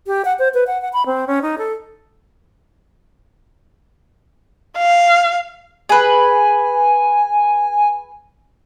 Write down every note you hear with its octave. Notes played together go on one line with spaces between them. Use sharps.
G4
F#5
C5
B4
F#5
F#5
B5
C4
C#4
D#4
A4
F5
G#4 B4 G#5